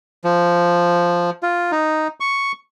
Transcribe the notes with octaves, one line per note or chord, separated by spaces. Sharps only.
F3
F4
D#4
C#6